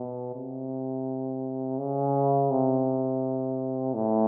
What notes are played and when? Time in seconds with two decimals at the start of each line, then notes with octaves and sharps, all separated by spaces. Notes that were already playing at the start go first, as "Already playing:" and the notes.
Already playing: B2
0.34 C3
1.79 C#3
2.51 C3
3.94 A2